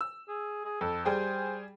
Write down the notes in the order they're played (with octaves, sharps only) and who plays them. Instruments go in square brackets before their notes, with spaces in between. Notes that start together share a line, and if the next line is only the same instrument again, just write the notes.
[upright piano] E6
[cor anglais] G#4
G#4
[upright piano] F2 [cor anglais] A4
[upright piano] G3 G#4 G5 [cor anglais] C5